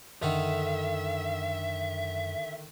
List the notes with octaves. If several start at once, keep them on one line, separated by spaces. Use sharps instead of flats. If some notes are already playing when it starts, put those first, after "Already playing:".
F#2 D3 D#3 E5